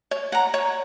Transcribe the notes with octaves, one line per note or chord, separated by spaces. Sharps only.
C#5
F#5 A#5
C#5